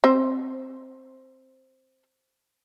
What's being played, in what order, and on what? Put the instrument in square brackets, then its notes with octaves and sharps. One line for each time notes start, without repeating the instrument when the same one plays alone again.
[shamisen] C4 C5